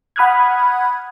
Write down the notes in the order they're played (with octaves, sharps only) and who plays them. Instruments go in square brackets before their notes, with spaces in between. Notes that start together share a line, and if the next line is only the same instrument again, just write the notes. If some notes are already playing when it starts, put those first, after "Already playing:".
[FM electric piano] F#5 B5 D#6 F6 F#6 G#6